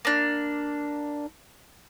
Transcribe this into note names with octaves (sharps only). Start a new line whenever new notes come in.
A#3 D4